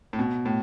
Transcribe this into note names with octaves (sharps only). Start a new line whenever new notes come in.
A2
B2
A2